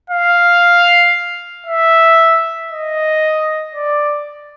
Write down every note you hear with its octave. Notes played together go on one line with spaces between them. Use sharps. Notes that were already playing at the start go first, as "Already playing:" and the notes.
F5
E5
D#5
D5